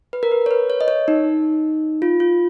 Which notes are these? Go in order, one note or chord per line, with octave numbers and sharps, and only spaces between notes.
B4
A#4
B4
C#5
B4
C#5
D#5
C#5
D#4
F4
F4